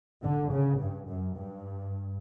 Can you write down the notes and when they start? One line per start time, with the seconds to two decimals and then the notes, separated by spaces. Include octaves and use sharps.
0.23 D3
0.52 C#3
0.79 G2
1.07 F#2
1.36 G2